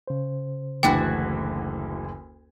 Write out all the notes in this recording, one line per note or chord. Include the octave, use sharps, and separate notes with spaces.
C#3 C5
F#1 D2 E3 D4 E4 F#4 G5